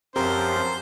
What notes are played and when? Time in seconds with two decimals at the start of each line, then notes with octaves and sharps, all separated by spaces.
0.16 F#2 F3 C4 G4 A#4 C5